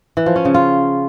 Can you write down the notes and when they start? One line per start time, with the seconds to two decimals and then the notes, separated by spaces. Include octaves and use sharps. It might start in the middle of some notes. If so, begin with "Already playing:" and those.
0.17 E3
0.26 F3
0.36 C#4
0.45 C#3
0.54 F4